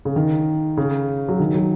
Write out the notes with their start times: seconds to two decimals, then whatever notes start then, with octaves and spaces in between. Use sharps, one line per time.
0.05 C#3
0.16 D#3
0.77 C#3
1.28 F#3
1.40 D#3
1.54 F#3